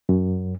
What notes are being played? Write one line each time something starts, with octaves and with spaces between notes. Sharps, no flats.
F#2